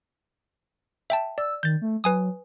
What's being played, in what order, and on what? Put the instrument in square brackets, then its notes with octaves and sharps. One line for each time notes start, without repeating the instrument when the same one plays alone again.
[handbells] E5 G5 A5
[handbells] D5 [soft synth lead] E6
[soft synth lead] D#3 [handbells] G6 A6
[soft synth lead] A3
[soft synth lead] F#3 [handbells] B4 G#5 D#6